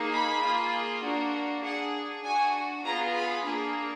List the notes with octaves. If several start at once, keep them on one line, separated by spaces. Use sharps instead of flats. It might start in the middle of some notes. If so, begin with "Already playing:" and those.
Already playing: A#3 D#4 G#4
B5
A#3 F4 G#4
A#3 D4 F#4
D4 G#4 F#5
D4 F#4 G#5
B3 F4 G#4 A#5
B5
A#3 D4 G#4